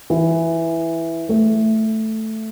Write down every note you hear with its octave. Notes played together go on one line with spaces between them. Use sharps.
E3
A3